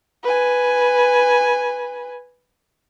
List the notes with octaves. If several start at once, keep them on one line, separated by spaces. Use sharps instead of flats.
B4 G#5